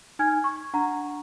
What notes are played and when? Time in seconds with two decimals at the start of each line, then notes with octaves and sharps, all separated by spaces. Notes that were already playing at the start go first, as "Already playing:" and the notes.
0.19 D#4 G#5 F6 G#6
0.44 C#6
0.73 D4 F#5 A#5